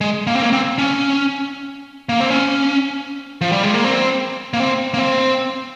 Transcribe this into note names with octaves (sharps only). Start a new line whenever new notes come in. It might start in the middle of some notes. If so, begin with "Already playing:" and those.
G#3
A#3
C4
A#3
C4
C#4
A#3
C4
C#4
F3
G3
G#3
A#3
C4
A#3
C4
A#3
C4